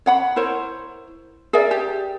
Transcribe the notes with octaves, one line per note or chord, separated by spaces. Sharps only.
C#5 F#5 B5
E4 A#4 C5 C#5
G#4 A#4 D5 E5
G4